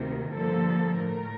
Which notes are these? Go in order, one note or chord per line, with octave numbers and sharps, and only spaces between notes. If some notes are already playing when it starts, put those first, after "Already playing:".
Already playing: D2 C3 D#3 A#3 A#4
G2 D3 F3 A#3 A4
A2 A3 A#4